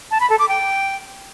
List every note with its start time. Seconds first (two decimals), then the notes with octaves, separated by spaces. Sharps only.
0.11 A5
0.20 B5
0.30 A4
0.39 D6
0.48 G5